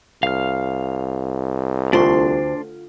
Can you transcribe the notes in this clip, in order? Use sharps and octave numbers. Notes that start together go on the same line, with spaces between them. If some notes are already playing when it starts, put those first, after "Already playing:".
C2 F5 F6
D2 D4 F4 C6